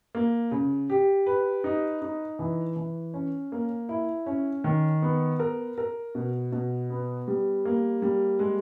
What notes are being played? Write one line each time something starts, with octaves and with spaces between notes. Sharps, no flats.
A#3
C#3
G4
B4
D#4
D#4
E3
E3
C#4
A#3
E4
C#4
D#3
B3
A#4
A#4
B2
B2
B3
G3
A#3
G3
G#3